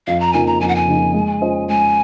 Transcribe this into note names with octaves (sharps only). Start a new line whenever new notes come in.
F2 F5
A#5
C#3 F3 A#3 D#4 G#5
A#5
F2 G#5
F#5
G#5
C#3 F3 A#3 D#4
G#3
C#4 F4 C5 D#5
G#3 G#5